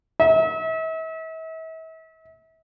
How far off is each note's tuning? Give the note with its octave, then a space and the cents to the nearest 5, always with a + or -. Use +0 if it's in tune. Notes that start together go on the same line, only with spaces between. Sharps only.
E5 -40